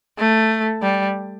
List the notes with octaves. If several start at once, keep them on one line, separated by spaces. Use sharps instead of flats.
A3
G3